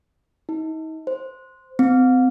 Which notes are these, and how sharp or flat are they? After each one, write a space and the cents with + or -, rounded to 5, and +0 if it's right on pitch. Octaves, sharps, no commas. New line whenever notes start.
D#4 +35
C5 -5
C4 -35